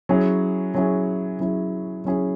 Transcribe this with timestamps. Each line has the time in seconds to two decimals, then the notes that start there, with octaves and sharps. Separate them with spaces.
0.09 F#3 C#4 E4 G#4
0.74 F#3 C#4 E4 G#4
1.40 F#3 C#4 E4 G#4
2.05 F#3 C#4 E4 G#4